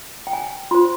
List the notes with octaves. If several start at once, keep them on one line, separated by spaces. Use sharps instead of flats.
G5
G#5
F4 C5 C6